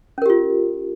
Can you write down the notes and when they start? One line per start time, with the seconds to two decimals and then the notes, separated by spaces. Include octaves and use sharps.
0.18 C#4
0.22 A#4
0.26 G4
0.30 F4